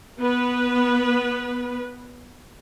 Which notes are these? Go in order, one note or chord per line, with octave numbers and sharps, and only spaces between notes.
B3 B4